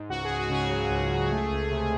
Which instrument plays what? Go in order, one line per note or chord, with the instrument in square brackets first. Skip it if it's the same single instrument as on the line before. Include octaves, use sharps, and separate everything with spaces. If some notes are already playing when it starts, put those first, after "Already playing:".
Already playing: [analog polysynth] G#2
C#2 F#4
C#2 G#4
F#4
C#3 G#4
F#3
C#2
C#2
A3
C#2
C3